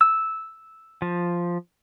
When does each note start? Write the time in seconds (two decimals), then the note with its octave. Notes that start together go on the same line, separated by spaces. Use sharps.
0.01 E6
1.02 F3